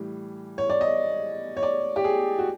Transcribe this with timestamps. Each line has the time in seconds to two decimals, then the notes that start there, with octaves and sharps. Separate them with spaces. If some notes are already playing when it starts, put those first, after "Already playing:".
Already playing: A2 E3 G3
0.58 C#5
0.70 D5
0.81 D#5
1.57 C#5
1.63 D5
1.96 G4
2.04 G#4
2.39 F#4